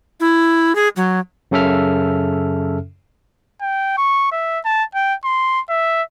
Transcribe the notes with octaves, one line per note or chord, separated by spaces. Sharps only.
E4
G#4
F#3
F#2 C#3 C#4 A4 E5 F6
G5
C#6
E5
A5
G5
C6
E5